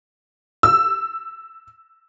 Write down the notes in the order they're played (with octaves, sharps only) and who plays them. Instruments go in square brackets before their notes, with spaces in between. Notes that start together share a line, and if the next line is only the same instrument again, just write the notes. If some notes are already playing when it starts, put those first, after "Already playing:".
[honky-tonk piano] E6